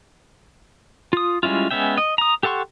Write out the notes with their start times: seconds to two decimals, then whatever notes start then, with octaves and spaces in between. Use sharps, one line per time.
1.13 F4 D#6
1.43 G3 G#3 C#4 E4 F4
1.71 G#3 B3 C#4 E5 G5
1.98 D#5
2.18 A#5 D#6
2.43 G4 A4 F#5 C6 C#6